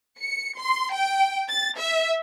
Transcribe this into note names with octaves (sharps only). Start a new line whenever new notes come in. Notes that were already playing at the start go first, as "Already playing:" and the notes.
C#7
C6
G5
A6
E5